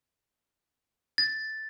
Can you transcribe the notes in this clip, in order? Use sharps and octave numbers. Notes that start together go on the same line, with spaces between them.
A6